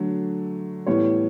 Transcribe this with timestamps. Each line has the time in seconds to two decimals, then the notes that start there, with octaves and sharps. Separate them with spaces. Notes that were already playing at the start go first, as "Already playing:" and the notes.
Already playing: D3 F#3 A3
0.87 A2 E3 G3 B3 C#5